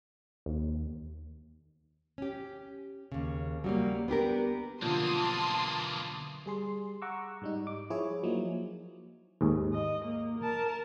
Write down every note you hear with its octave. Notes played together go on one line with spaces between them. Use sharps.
D#2
C#4 G4
D#2 C#3
F#3 G3 A#3
B3 D4 G4 A#4
B1 D3 E3 F3 A#3 A5 C6 D#6
G3 G#4 C6
F#5 A#5 C#6 D6 E6
G#2 G3 D#4
D6
F3 E4 G#4 C#5
F3 F#3 A#3 D#4
D#2 G#2 G#4
D#5
A#3
A#4 A5